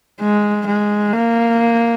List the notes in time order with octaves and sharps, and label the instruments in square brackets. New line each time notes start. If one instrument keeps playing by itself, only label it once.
[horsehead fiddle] G#3
G#3
A#3